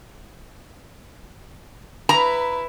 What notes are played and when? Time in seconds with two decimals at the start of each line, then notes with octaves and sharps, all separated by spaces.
2.09 E4 B4 A#5